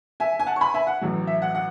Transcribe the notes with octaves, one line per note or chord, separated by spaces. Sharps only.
E5 G#5
G#5
F#5 A5
C#6
G#5 B5
E5 G#5
F#5
A1 A2 F#3
E5
F#5
F#5